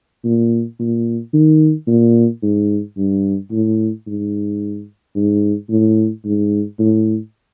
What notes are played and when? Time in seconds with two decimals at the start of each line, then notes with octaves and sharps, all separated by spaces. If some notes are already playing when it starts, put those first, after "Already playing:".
0.24 A#2
0.79 A#2
1.33 D#3
1.87 A#2
2.42 G#2
2.97 G2
3.51 A2
4.07 G#2
5.15 G#2
5.70 A2
6.25 G#2
6.79 A2